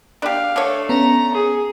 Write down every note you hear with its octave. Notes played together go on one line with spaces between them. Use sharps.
D4 G4 F5
D3 A3 C#5
B3 C#4 A#5
G#4